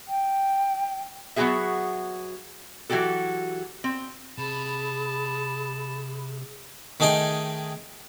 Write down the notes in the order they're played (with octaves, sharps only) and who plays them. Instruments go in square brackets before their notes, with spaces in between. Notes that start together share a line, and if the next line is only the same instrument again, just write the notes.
[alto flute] G5
[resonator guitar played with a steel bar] F#3 B3 F4 F#4 G#4 E5
E3 F#3 F#4 G4 A4
C4
[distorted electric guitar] C3 [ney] G#4 [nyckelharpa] A5 [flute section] B5
[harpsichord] D#3 A3 D#4 G#4 G5 G#5